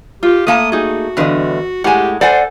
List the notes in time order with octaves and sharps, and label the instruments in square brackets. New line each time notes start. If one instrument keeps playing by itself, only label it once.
[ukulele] F4 [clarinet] G4
[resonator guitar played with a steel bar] A3 A#3 A5 [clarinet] D#6
[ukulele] D#4 G#4 [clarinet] F#4
[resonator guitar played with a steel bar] E2 G2 D3 [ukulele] B4 D#5
[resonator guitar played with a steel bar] A2 G#3 [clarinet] G4 [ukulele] F#5 G#5
[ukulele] A4 [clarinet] C5 [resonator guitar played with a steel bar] D5 F#5 G#5